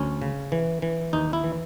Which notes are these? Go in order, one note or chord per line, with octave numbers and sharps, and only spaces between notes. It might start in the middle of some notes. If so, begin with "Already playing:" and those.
Already playing: D2 C#4
C#3
E3
E3
D#2 D#4
E4
E3